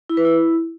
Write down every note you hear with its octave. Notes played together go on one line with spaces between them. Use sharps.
E4
B4
E4